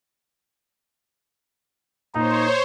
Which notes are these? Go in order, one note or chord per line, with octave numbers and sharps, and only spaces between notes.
A#2 D#4 C5 C#5 A#5